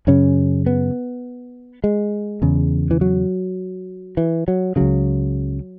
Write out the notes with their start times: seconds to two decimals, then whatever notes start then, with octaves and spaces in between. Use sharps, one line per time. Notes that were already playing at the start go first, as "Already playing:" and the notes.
0.07 F#2 C#3 C#4
0.66 B3
1.84 G#3
2.42 E2 C#3
2.91 E3
3.01 F#3
4.17 E3
4.48 F#3
4.76 C#2 C#3 F#3